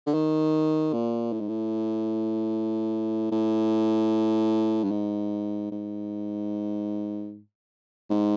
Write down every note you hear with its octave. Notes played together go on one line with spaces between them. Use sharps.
D3
D#3
A#2
A2
G#2
A2
A2
G2
G#2
G#2
G#2